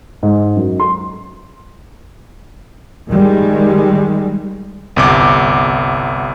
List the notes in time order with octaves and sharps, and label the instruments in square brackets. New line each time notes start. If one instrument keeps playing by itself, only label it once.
[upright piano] G#2
F#2
C6
[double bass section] D#3 G3 G#3
[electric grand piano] G1 C2 D6